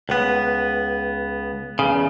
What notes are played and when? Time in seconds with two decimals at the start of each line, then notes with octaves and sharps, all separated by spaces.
0.09 C#2 B3
1.79 E2 C#3